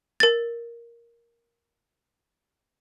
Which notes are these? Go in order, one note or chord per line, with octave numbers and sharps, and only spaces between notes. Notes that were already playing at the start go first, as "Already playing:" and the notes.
A#4 A6